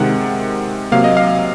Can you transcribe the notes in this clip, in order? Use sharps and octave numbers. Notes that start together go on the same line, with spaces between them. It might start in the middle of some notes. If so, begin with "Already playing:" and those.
Already playing: C3 D#3 G#3 F#5
C3 F#3 A#3 F5
D#5
F5